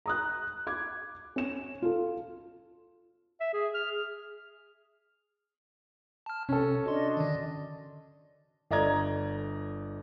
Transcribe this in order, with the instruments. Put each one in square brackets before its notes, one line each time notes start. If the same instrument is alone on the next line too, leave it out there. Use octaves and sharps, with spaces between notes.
[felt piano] A#5 D#6 F#6
D6 G#6
C#4 E7
F4 A4
[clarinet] E5
G#4
F6
G#4
[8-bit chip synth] A5 F6
[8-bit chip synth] C3 [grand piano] C#4 A4
[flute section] D4 D#5 [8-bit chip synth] F#4 C6
[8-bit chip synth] D3 D#3
[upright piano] G1 D5 D#5 A#5 G#6